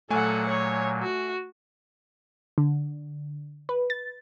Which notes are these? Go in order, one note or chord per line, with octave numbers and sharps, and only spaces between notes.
A#2 F#3 A3 A4 F#5 G#5
C#5
F#4
D3
B4
A6